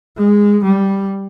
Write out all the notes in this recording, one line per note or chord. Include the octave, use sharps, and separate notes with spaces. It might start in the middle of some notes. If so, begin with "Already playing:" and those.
G#3
G3